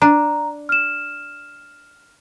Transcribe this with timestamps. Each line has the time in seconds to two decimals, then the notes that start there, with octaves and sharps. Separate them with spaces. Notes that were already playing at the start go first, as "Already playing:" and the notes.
0.02 D4 A#5
0.69 F6 E7